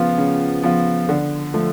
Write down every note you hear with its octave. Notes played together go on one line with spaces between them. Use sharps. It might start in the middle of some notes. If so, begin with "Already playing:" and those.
Already playing: C#3 F3 B3 F4
C#3
F3 B3 F4
D3
F3 A3